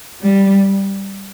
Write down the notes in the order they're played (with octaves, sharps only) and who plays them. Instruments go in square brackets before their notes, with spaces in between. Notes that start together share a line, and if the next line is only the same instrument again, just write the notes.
[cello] G3